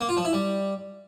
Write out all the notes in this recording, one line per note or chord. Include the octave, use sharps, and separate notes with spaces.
A#3
F4
F3
E4
G3